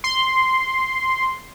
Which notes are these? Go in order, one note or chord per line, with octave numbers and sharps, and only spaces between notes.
C6